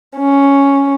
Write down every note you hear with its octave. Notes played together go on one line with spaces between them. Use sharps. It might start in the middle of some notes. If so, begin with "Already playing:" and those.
C#4